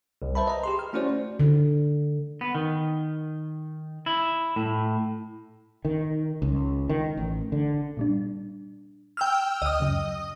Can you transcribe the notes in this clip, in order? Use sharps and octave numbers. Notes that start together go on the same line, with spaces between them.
C2
B4 C5 E5 A5 B5
D#5 A#5
G4 G#4 C6
F6
A3 C#4 E4 F#4 C5 D5
D3
B3
D#3
E4
A2
D#3
C#2
D#3
A1
D3
A#2 G3 D4
G5 E6 F6
D2 D#5 D#6
F#2 C#3 F#3